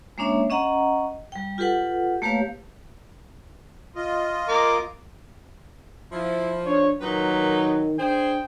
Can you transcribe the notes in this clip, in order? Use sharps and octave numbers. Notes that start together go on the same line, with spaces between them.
G#3 A#3 C#4 D4 C#5 E5
C#4 D#5 F#5 A#5
G3 G5
F4 G4 A4 B4 F#5
A3 A#3 G4 B4 C#5 F5
F4 D#5
A#4 D6
F3 E4
D4 C#5
A#2 D#3 F#3 D#4 B4
D4 G#4 C5 G5